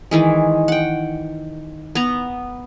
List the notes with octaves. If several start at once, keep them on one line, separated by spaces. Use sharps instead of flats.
D#3 E3 G#3
F#5 G5
B3 A#5